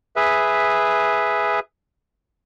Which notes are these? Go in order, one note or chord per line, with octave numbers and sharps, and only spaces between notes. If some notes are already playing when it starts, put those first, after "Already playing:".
G#4 B4 E5